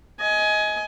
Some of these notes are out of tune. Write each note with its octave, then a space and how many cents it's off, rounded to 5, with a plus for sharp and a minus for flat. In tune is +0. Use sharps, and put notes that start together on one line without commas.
D#5 +25 G#5 +20